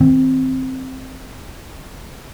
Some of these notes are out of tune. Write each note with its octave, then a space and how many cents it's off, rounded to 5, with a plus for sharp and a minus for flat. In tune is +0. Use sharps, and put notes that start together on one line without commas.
D#3 +40 C4 +0